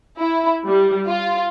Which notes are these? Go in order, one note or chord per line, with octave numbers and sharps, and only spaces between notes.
E4
G3
F4